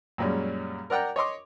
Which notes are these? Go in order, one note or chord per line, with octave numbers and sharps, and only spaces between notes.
F#2 A#2 G3 G#3 C#4
A#4 D5 F#5 G5 A#5
C#5 D#5 C6 D6